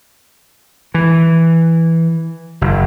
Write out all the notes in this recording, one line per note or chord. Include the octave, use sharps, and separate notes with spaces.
E3
F#1